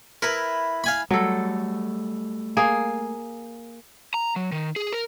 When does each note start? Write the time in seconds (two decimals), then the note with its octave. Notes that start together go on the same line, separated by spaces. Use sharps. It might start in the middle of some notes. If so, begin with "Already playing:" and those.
0.22 E4 A#4 B4
0.84 F5 G#5 B5
1.11 F#3 G3 A3 A4
2.57 A#3 G#4
4.14 A#5
4.36 F#3
4.52 D#3
4.76 G#4
4.93 A#4